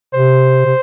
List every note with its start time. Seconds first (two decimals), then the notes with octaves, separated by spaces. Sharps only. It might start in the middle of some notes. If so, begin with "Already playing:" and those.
0.15 C3 C5
0.65 C3